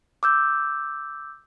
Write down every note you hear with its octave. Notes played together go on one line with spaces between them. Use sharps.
D6 E6 G6